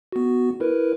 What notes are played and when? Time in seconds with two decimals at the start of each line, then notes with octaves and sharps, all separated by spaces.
0.12 B3 F#4
0.60 E4 A#4 B4